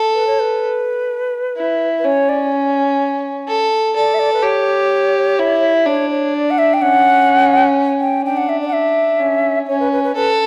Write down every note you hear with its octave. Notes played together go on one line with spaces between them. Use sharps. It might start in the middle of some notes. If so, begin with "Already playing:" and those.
Already playing: A4
B4
C#5
B4
E4
B4
C#4 C#5
D5
A4
A4 D5
E5
D5
B4
G4 C#5
E4
D4 C#5
C#5
D5
F#5
E5
G5
C#4 F#5
G5
D4 G5
F#5
E5
D5
F#5
E5
C#4
C#4 C#5
B4
B4
B4
A4 B4